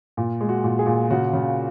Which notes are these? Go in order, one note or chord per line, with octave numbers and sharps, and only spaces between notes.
A#2
G#3
F#4
A#2
G#4
A#2
C#3 F#4
C#3